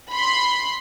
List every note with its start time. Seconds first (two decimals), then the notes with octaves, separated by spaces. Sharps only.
0.11 B5 C6